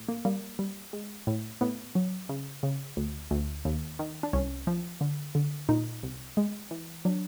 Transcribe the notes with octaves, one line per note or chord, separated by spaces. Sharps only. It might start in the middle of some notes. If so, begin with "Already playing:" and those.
Already playing: A2
A#3
G3 A#3
G3
G#3
A2
A2 B3
F#3
C#3
C#3
D2
D2
D#2
D#3
D4
C2 C#4
F3
D3
D3
A#2 D#4
C2
G#3
E3
F#3 D4